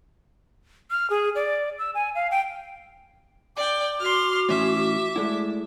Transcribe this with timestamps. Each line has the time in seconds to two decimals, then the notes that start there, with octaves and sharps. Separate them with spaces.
0.91 F6
1.10 G#4
1.35 D5
1.79 E6
1.95 G#5
2.15 F5
2.31 G5
3.57 D5 G5 D6
4.00 F#4 C6 F6
4.49 A2 E3 C#4 E5
5.16 G#3 A3 E4 D5